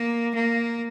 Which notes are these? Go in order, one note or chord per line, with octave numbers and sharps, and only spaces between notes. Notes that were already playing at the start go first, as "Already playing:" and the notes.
Already playing: A#3
A#3